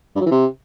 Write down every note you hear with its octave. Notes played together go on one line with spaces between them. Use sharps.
G2
F#3
E3
C3